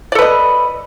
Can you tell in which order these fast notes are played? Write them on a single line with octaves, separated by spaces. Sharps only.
D5 A4 B4 D#5